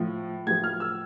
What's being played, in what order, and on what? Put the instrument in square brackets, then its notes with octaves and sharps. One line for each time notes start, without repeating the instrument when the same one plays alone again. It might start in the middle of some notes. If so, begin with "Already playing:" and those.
Already playing: [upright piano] A2 F3
A2 G#6
F3
F6
E6